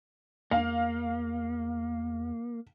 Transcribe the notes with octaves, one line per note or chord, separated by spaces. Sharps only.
E2 A#3 F5